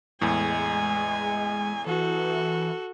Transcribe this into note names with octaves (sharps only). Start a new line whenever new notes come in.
E2 A2 G#3 G#5
E3 F#4 A4